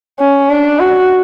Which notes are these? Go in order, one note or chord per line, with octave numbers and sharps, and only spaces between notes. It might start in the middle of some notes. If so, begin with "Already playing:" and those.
C#4
D4
F#4